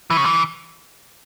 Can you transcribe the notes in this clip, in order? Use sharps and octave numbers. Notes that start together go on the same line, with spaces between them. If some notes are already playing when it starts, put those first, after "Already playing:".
E3
C#3
E3